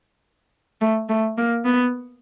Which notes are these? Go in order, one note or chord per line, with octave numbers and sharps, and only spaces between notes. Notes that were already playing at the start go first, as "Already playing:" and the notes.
A3
A3
A#3
B3